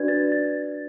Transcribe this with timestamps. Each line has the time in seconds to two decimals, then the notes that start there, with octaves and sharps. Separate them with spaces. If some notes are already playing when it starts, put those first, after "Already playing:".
Already playing: D4 F#4 B4 D5 G#6
0.08 A6
0.32 A6